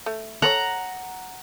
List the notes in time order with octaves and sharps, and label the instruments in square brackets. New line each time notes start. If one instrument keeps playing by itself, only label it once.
[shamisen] A3
[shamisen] A4 B4 C#5 [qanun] F#5 A#5